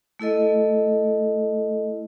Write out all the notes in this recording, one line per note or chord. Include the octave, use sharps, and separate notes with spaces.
A3 E4 A4 D#5